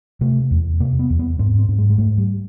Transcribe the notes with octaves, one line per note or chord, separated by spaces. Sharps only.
C3 A3
E2
C3 A#3
B3
E2
B3
G#2 C4
C4
G#2
G#3
G#3
G#2 A3
G3